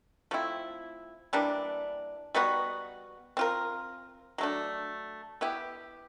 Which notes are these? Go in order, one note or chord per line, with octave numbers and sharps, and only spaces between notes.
F3 A3 C4 E4
E3 G3 A#3 D4
G3 B3 D#4 F#4
C4 F4 A#4
F#3 A3 D4
B3 E4 G4